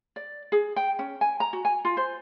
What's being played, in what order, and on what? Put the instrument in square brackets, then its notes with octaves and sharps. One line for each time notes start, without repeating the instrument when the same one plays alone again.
[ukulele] D5
G#4
G5
C#4
G#5
A#5
F#4
G#5
F4
C5